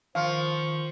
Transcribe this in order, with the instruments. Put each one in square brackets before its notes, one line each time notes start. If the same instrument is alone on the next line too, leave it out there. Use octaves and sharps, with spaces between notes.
[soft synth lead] D#3 [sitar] F3 [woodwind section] C5 C#6 [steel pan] F5